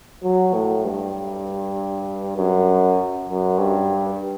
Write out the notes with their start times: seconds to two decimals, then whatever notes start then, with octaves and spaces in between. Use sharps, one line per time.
0.23 F#3
0.54 A2
0.85 G2
2.37 F#2
3.29 F#2
3.58 G2